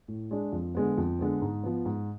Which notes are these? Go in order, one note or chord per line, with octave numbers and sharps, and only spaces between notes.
A2
G#3 D4
F2
D3 G#3 B3
F2
D3 G#3 B3
G#2
F3 B3
G#2